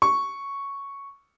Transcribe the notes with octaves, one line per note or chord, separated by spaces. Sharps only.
C#6